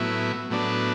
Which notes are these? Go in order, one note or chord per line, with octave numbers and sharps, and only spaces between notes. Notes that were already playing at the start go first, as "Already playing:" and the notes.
Already playing: A2 F#3 B3 E4
A2 F#3 B3 D4